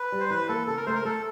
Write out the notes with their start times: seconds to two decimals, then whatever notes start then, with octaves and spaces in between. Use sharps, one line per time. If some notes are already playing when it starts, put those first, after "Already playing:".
Already playing: B4
0.12 G3
0.20 C5
0.30 E3 B4
0.48 A#3 A4
0.67 C#3 A4
0.77 A#4
0.87 A3 C5
0.95 A#4
1.05 A3 A4